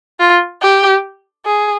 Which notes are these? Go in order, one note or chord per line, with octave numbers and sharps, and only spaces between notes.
F4
G4
G#4